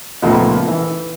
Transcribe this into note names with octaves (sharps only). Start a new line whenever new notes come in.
C#2 A#2 F3 A3 B3 D#5
E3